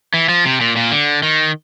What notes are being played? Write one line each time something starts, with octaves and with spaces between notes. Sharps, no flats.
E3
F3
C3
A#2
A#2
D3
D#3